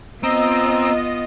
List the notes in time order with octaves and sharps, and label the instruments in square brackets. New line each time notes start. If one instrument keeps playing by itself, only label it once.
[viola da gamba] B3 F4 [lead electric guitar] C4 [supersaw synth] D#5 [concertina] A#5 E6